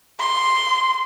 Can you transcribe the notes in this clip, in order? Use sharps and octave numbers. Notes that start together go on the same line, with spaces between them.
C6